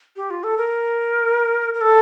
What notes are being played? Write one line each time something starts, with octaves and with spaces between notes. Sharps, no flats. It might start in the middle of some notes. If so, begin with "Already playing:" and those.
G4
F4
A4
A#4
A#4
A4